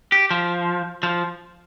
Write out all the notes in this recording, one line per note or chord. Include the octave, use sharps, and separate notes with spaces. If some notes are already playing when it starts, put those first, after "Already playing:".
G4
F3
F3